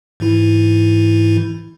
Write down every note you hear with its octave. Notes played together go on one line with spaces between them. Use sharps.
G#2 E3 E4